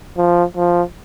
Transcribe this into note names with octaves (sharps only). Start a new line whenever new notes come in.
F3
F3